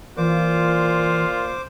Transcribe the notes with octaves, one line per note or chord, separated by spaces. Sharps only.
A#2 E3 F4 C5 D6